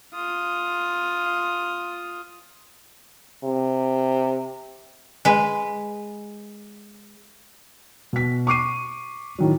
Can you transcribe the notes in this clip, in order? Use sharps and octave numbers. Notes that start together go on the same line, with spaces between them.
F4 D#6
C3
G#3 B4
B2 B6
C#6 D6 C7 D#7
A2 D#3 F#3